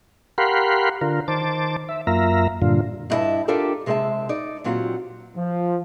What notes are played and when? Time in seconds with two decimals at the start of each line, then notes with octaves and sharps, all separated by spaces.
0.38 G4 A#4 F5 F#5 B5 C6
1.01 D3 F4 A#4
1.28 D#3 C5 A5 D6
1.89 E5
2.07 F#2 A#3 F4 E5 A#5
2.62 G2 A#2 D3 F4
3.10 G2 D#4 E4 A#4 D#5 A5
3.48 D4 F4 G4 A4 A#4 D5
3.86 C3 G#3 C4 B4 E5 A5
4.29 D#4 D5
4.64 A#2 F#3 C4 F4 G4 F#5
5.35 F3